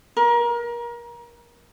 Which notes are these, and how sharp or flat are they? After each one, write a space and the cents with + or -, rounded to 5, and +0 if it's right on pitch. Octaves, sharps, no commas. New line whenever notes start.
A#4 +30